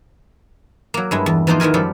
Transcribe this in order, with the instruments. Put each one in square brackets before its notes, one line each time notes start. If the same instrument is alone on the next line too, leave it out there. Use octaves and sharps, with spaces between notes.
[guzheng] F#3 A#3
G2 G#3 E4
E2
E3 F3 A#3 D#4 F4 C5
E2 D#3 E3 A#4 G#5
F#2 F3 G3 G4 A4